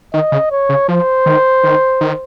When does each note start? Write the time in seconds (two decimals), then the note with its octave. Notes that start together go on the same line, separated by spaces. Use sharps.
0.14 D#3 D#5
0.32 C#3
0.51 C#5
0.69 C#3
0.88 F3 C5
1.26 D#3
1.64 D#3
2.01 D#3